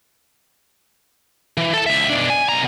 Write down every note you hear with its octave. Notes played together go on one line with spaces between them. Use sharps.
E3
A4 A5
C#2 E5
B2 D4
G#5
B2 A#5